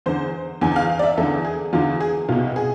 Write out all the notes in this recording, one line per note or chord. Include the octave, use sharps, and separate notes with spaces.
E2 D3 C5
E2 D3 G#5
G#5
F5
F5
D5
E5
E2 D3 A4
G#4
E2 D3 F4
G#4
C2 B2 F4
G#4